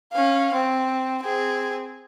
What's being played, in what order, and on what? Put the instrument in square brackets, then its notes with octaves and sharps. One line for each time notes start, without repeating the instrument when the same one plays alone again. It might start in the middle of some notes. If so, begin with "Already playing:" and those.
[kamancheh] C#4 F5
C4
C4 G#4